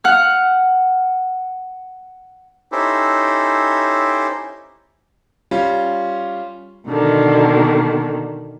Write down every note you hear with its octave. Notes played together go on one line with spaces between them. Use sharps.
F#5 F6
C#4 D#4 E4 G4 A4 C5
G3 C#4 F4
B2 D3 D#3